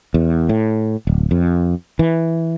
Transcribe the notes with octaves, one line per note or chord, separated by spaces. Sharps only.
E2
A2
D1
F2
E3